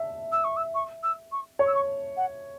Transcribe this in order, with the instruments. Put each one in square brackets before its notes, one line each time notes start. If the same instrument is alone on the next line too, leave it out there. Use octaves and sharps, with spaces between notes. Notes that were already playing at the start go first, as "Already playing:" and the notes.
Already playing: [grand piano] E5
[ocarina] E6
C#6
E6
C#6
E6
C#6
[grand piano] C#5 [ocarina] C#6
[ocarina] E6
C#6
F#5